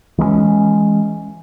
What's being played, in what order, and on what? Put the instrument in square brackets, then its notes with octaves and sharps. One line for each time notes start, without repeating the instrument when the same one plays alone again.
[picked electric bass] E3 G#3 A3 C#4